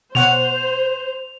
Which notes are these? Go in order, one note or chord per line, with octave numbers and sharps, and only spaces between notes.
B2 C5 C#5 F#5 F7